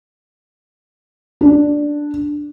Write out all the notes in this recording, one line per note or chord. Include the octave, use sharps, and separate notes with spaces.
D4